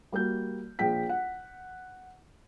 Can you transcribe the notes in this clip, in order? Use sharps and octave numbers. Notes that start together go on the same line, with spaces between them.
G3 A#3 F#4 G6
A#1 G#4 G5 B6
F#5